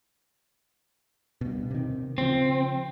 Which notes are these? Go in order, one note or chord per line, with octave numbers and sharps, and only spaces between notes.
G2 B2
C3 D#3
C#3 F3 C4